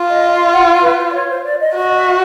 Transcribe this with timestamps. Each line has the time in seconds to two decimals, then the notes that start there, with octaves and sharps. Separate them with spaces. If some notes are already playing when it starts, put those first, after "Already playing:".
Already playing: F4
0.12 D#5
0.32 F5
0.53 F#5
0.68 F5
0.83 B4
0.99 C5
1.08 D5
1.14 C#5
1.30 C5
1.45 D5
1.60 D#5
1.76 F#4 D#5
1.91 D#5
1.97 E5